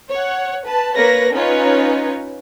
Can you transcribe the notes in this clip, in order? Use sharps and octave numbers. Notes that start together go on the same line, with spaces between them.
C#5 F#5
B4 A5
A#3 A#4 B4 C#5 A#6
C#4 D#4 F4 B4 C#5